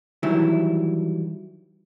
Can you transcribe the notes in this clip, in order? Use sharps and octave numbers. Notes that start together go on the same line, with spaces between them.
D#3 E3 F#3 G3 E4